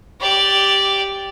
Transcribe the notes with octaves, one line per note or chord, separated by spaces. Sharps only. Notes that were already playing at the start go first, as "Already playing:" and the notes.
G4 D5